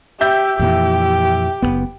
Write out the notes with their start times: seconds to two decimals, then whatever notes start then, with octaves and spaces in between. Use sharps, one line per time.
0.21 G4 E5 G6
0.59 F2 A#2 E3 G4
1.62 F#1 G2 B3